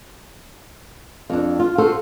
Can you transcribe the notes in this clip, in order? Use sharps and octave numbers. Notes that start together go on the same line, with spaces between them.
F2 D4
F4
F4 F#4 A4 C5